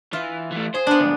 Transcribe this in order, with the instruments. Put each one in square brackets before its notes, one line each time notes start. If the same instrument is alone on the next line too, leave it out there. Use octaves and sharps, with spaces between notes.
[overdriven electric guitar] E3 [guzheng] F4
[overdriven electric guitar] E3 A3
[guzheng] G#4 [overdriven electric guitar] C5
[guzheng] B3 D4
[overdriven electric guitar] D2 G#2